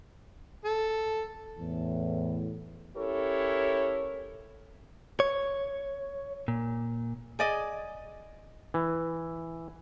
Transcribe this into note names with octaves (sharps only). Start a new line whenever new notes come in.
A4
E2 A2
C#4 E4 G4 A4 A#4 C#5
C#5
A#2
G#4 D5 D#5
E3